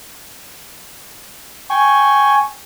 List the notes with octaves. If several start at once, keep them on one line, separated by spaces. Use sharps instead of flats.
G5 G#5 C#6